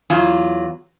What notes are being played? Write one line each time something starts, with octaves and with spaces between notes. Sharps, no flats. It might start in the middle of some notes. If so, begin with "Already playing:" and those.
E2 F#3 F4 G#5